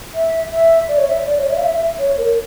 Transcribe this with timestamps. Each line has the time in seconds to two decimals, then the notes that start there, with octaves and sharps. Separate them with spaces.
0.15 E5
0.52 E5
0.89 D5
0.98 C#5
1.08 E5
1.25 D5
1.38 C#5
1.46 D5
1.50 E5
1.57 F5
1.62 E5
1.75 E5
1.99 C#5
2.18 A#4